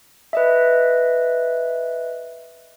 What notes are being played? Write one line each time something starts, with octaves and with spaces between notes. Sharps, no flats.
B4 D#5 E5